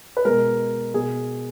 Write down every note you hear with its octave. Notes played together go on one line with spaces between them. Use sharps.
B4
B2 G#3 A#4
B2 G#4